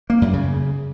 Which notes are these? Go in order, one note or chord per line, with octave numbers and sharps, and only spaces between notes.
A#3
F#2
C#3